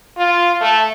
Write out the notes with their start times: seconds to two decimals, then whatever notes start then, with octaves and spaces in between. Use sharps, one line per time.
0.17 F4
0.60 A3